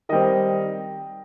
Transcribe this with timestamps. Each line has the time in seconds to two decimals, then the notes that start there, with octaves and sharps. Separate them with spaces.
0.09 D#3 G3 C4 D#5